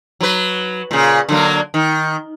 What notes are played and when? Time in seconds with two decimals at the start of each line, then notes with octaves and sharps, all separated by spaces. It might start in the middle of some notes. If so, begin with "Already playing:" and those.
0.21 F#3 B4
0.91 A#2 C#3
1.29 D3 F#3 A#3
1.74 D#3